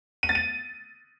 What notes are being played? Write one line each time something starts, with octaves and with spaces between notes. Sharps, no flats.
D#7
A6
D#7